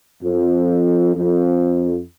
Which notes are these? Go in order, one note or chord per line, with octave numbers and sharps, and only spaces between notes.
F2
F2